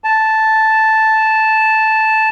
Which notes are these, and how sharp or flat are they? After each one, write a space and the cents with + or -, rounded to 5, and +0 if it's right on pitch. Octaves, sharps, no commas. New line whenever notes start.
A5 -5